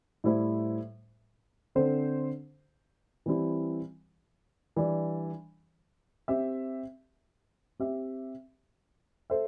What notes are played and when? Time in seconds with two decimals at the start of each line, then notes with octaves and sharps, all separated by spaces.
0.24 A2 G3 E4 C5 E5
1.75 D3 C4 A4 C5
3.26 E3 G3 C4 E4 G4
4.76 E3 G3 D4
6.28 C4 G4 E5
7.79 C4 G4 E5
9.30 A4 C5 E5